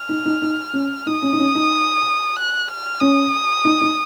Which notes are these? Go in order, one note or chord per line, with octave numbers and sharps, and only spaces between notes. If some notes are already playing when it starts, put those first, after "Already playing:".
Already playing: F6
D#4
D#4
D#4
C#4
D#4 D#6
C#4
D#4
C#4
D#4
F#6
F6
C#4 D#6
D#4
D#4